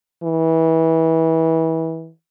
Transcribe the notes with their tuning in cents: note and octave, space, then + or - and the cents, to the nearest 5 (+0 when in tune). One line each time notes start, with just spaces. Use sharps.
E3 -25